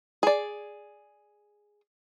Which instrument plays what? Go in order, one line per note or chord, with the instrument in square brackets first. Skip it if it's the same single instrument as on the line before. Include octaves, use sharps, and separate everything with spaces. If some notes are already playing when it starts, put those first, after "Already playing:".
[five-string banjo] G#4 D5